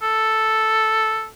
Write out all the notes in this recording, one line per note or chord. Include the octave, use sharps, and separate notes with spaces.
A4